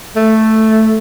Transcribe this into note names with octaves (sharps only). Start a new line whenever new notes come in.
A3